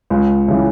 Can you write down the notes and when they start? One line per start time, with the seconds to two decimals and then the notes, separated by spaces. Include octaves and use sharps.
0.10 C#2
0.48 C#3 E3